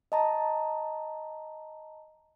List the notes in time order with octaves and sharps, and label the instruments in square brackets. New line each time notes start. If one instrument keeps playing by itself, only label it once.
[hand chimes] D#5 A5 A#5